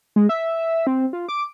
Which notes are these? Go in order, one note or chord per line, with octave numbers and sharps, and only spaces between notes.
G#3
E5
C4
F4
D6